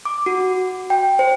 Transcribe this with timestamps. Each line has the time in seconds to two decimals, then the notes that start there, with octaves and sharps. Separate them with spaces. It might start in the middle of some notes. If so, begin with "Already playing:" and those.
0.05 D6
0.26 F#4
0.90 G5
1.19 C5